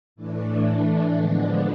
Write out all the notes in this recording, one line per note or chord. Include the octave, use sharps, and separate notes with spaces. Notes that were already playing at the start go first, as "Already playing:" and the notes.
A2 E3 A3 D4
D3 F3 G#3 B3 D4